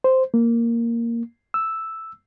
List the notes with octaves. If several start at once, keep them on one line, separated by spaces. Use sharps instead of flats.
C5
A#3
E6